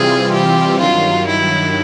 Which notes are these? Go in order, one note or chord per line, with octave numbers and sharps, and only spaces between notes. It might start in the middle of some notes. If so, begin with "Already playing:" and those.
Already playing: C3 E3 G3 C4 F4 G#4
G4
G2 D#3 F#3 F4
E4